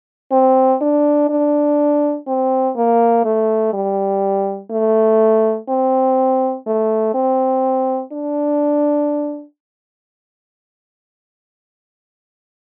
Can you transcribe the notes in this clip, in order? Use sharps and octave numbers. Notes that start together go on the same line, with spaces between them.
C4
D4
D4
C4
A#3
A3
G3
A3
C4
A3
C4
D4